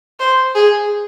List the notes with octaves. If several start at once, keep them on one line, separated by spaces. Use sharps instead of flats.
C5
G#4